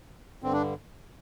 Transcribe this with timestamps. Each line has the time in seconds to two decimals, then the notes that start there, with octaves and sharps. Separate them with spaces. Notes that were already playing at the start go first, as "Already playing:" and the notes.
0.42 G2 D3 C4
0.53 D4